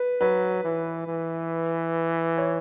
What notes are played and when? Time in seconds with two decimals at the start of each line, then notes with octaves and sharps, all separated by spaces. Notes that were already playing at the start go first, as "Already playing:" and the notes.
Already playing: B4
0.21 F#3 B4
0.64 E3
1.08 E3
2.38 C#5